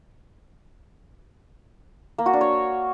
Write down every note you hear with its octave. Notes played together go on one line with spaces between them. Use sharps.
A#3
F#4
D4
C#5